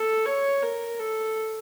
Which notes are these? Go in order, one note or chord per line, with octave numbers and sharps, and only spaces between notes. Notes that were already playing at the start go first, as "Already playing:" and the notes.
Already playing: A4
C#5
A#4
A4